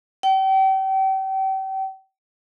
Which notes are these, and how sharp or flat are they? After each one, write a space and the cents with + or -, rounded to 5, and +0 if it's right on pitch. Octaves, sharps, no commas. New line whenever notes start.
G5 -35